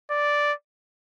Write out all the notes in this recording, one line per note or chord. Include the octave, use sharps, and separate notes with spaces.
D5